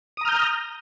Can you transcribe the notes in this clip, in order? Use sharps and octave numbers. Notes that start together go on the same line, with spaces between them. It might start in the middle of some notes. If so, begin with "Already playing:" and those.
A#5 D#6 F6 G6